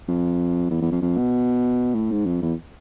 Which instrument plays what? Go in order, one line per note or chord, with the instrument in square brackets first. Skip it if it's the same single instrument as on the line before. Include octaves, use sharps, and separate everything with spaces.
[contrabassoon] F2
E2
E2
F2
F2
B2
A2
G#2
F2
E2